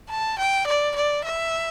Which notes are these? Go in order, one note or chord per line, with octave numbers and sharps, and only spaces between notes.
A5
G5
D5
D5
E5